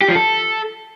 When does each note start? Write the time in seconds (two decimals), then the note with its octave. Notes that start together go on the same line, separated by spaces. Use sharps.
0.01 G4
0.09 F3
0.16 A4